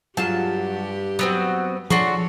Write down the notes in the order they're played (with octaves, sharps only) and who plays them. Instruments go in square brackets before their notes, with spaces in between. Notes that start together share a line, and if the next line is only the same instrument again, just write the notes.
[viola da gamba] G2 G4 [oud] F#3 F4 G#4 [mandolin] A5
[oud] F#3 [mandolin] B3 C4 F#4
[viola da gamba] E3 A4 C#5 [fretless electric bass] F3 [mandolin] D4 F#4 C6 [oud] G#4